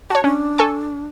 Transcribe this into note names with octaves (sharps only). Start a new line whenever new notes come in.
F#4 C#5 A5
C#4 D4
A4 G#5 C#6